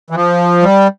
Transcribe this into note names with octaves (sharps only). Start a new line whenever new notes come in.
E3
F3
G3